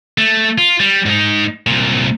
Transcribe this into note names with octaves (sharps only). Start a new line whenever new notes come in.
A3
F4
G3
G#2 D#4
C2 A#2